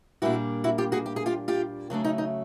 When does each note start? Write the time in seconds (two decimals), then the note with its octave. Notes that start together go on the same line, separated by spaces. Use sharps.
0.22 A#2 G3 A#3 D4 E4 F#4
0.64 E4 F#4
0.78 F4 G4
0.92 F#4 G#4
1.06 G4
1.16 G#4
1.26 F4 G4
1.48 F4 G4
1.90 C#3 F#3 A3 D4
2.04 D#4
2.18 D#4